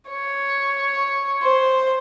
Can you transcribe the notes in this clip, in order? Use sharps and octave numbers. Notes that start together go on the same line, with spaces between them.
C#5
C5